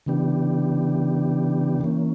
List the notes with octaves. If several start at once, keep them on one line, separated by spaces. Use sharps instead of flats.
C#3 E3 B3 D4 G4
E3 A#3 C#4